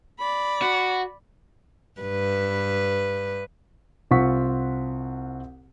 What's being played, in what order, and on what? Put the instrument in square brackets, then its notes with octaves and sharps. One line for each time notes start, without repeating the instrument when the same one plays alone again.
[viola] D5 B5
[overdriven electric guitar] F#4
[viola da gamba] G2 B4
[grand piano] C2 C4 F4 F#5 C#6 B6